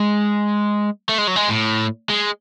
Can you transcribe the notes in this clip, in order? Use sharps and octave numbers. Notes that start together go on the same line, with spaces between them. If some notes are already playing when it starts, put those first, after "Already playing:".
Already playing: G#3
A3
G#3
F#3
G#3
A2
G#3